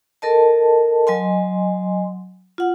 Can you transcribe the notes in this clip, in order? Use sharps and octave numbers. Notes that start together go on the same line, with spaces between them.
A4 A#4 D#5 A5
F#3 D#5 G#5 C6
F4 F#5